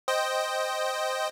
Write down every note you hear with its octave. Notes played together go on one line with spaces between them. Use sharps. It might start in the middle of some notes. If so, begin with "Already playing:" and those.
C5 D#5 G5